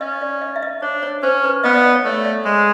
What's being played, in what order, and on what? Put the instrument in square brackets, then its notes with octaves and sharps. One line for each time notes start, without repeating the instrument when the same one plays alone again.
[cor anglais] C#4 [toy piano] D#5
[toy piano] D5
D#5
E5
D#5
[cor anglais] D4 [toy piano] C#5
[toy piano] C#5
[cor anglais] C#4 [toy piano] C5
[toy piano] B4
[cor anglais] B3 [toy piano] D#5
[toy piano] D5
D#5
C#5
[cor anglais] A3 [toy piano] D5
[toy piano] C#5
D5
[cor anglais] G#3 [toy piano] C#5